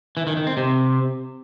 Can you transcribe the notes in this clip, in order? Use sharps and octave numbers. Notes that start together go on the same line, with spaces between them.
E3
D#3
D#3
C4
C3